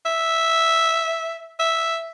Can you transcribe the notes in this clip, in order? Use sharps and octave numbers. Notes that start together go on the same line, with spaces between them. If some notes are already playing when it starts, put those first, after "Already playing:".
E5
E5